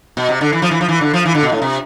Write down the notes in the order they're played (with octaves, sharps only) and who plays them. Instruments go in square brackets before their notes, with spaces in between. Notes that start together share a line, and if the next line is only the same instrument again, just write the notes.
[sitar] B2
C3
D3
E3
F3
E3
F3
E3
D3
F3
E3
D3
B2
A2
C3